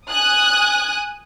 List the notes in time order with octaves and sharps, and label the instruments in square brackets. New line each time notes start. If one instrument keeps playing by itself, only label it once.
[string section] G#5 D#6 F#6